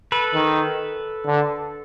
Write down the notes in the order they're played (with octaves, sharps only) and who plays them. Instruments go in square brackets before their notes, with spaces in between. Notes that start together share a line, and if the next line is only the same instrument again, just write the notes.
[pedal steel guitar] A4 B4
[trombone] D#3
D3